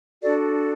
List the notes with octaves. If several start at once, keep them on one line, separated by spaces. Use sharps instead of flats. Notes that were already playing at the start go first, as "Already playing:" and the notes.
D4 F#4 A4 D5